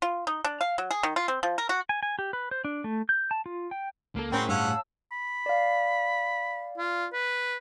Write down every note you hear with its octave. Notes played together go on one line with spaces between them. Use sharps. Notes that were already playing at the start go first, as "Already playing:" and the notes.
F4
D#4
D4
F5
F#3
G#4
D#3
F4
C4
F3
A#4
F#4
G#5
G#5
G4
B4
C5
D4
A3
G6
A5
F4
G5
C#2 A#3 A4
A2 C4 C#4 F#4 G#4 A#4 G5 B5
G2 C#4 F5 F#5 A5 E6
B5
D5 F5
F4
B4